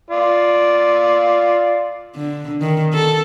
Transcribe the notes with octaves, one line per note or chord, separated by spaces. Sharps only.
F4 D5
D3
D#3
A4